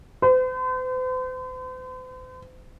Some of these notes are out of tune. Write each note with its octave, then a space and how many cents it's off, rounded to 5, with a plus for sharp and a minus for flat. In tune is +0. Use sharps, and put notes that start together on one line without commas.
C5 -45